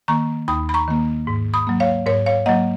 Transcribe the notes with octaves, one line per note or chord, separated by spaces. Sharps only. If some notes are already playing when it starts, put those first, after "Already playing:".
D#3 A#3 A#5 C#6
D#2 B5 D#6
B5
A#5 C#6
D#3 A#3
G#2
B5 D#6
F#3 A#3
C#5 F5
G#2 A#4 C#5
C#5 F5
F#3 A#3 D#5 F#5